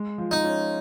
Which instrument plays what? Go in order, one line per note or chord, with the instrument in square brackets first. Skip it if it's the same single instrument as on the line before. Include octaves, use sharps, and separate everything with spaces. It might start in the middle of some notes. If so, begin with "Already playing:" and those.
Already playing: [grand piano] G#3
F3
[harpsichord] D#4
[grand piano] C#4